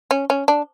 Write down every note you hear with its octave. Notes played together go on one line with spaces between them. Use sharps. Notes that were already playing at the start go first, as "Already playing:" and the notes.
C#4
C#4
D4